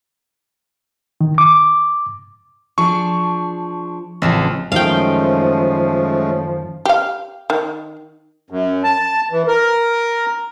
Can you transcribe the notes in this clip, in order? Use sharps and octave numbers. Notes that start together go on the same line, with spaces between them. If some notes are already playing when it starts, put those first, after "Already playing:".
D#3
D6
F3 D4 G#4 C#6
A1 C#3 F3 C4
F#2 D#3 F3 G#3 A3 C#4 F5 G5
G4 F5
D#3
F#2
A5
E3
A#4